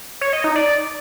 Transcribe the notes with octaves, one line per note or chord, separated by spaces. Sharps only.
C#5
D#5
D#4
D5